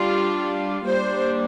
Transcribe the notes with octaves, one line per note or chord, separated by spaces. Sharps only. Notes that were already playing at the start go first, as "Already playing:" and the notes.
Already playing: G3 D4 F4
G3 A#3 D4 C5